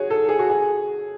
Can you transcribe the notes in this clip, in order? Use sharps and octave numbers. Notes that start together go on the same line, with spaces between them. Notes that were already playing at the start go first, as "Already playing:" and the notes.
Already playing: F#4 G#4 C#5
A4
G#4
F#4
G#4